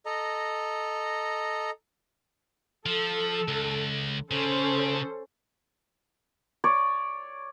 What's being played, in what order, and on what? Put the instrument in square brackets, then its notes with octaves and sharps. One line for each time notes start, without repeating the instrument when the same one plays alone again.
[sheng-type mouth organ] A4 D#5 A#5
[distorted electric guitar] F3 [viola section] A4
[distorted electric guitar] C#2
[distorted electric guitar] C#3 [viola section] C#4 A4 C5
[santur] C#5 D5